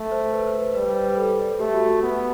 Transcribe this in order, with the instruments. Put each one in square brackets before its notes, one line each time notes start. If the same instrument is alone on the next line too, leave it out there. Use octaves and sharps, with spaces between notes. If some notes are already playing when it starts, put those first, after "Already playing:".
Already playing: [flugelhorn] A3
[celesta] C5
B4
C5
B4
[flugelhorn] G3 [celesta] B4
[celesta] C5
B4
A4
[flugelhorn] A3 [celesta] G4
[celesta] F#4
F#4
[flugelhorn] B3